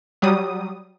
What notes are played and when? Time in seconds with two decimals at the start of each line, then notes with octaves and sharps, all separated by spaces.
0.22 F#3 G3 D#6